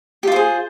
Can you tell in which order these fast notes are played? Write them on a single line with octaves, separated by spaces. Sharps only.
G4 F4 C5 G#4